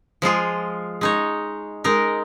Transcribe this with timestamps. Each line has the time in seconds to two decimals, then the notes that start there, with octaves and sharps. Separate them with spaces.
0.22 F3 G#3 F4 G#4
1.01 G#3 D#4 C#5
1.84 G#3 D#4 A#4